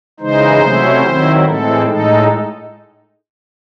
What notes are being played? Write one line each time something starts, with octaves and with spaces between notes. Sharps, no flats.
C#3 E3 G#3 D#4 C5
C3 F#3 A3 C#4 E4
D#3 F#3 C4 E4
A2 E3 G#3 C4 A4
A2 G#3 D#4 A4